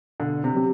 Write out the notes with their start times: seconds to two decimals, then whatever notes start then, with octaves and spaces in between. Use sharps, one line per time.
0.20 B2 D3
0.44 C3
0.55 F#3 C4 G4